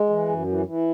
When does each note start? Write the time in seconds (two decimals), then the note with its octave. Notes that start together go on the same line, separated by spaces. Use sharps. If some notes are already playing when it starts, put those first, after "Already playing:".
Already playing: G#3
0.09 E3
0.28 F#2
0.47 E3
0.66 E3